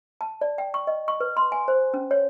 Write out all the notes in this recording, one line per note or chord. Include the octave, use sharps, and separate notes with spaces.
A5
D5
G5
C#6
D#5
C#6
B4
C6
G#5
C5
C#4
C#5